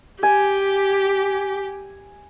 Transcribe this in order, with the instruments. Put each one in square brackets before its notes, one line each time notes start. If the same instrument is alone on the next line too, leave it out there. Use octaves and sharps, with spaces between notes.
[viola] G4 [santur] G#5